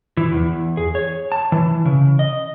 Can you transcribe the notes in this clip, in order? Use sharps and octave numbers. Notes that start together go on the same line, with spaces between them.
E3
E2
G#4
C#5
A5
E3
C#3
D#5